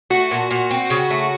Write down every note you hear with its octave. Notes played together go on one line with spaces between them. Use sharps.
A3 F#4
A#2
A#2
C4
C#3
A3